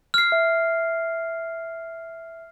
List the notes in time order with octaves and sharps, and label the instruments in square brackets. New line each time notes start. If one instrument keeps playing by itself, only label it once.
[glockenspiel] F6 C7
[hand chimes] E5